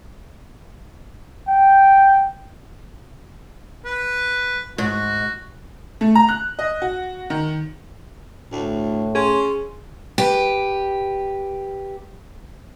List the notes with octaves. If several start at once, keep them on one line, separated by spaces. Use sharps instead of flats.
G5
B4
G#2 F#4
A3
A#5
F#6
D#5
F#4
D#3
D2 A2
C#4 G#4 C6
G4 B4